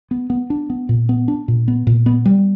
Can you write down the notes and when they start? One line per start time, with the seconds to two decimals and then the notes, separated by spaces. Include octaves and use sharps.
0.11 B3
0.30 B3
0.50 D4
0.70 B3
0.89 A#2
1.09 B3
1.28 D4
1.48 A#2
1.68 B3
1.87 A#2
2.06 B3
2.26 G3